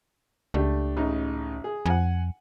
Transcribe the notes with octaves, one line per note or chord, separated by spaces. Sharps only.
C#2 A3 D4 G4
A1 C#3 D#4
G#4
F2 F#5 G#5